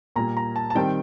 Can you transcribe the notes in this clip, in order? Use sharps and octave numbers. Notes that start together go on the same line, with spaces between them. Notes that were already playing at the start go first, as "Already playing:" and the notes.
A#2 G3 A#3 A#5
A#5
A5
A5
D#3 G3 C4 D#4 G5